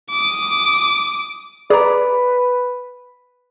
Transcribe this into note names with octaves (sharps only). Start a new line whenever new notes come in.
D6 D#6
G#4 B4 D5 A#5